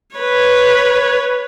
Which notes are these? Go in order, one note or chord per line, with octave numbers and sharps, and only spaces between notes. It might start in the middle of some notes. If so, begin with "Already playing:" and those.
B4 C#5